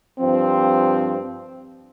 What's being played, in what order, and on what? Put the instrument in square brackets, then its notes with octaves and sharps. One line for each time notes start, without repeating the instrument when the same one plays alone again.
[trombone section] G2 F3 C4